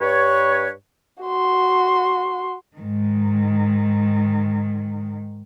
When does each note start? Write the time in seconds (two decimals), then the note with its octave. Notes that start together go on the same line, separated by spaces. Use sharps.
0.01 G2 B4 C#5
1.23 F#4 C6
2.77 G#2 D#3